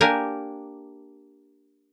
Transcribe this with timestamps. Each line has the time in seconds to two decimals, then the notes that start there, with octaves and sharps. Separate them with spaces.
0.01 A#3 D4 G4 A#4 G#5